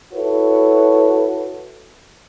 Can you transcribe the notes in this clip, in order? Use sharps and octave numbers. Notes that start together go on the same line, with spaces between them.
E4 F#4 A4 B4 C#5